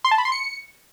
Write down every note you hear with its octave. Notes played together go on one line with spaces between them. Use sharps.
C6
A5
B5
C6
C#7